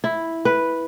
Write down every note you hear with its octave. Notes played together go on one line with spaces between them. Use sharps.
E4
B4